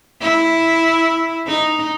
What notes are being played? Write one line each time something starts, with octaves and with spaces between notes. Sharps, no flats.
E4
D#4